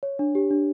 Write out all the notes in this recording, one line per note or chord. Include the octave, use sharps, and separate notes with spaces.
C#5
D4
G4
D4